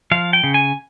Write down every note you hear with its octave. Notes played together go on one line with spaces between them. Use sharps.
F3 F5
G5
C#3
G#5